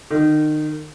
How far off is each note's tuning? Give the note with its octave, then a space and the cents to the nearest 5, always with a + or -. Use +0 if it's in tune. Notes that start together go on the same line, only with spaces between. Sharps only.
D#3 -30